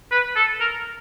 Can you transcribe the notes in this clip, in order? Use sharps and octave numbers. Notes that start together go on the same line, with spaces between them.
B4
A4
A#4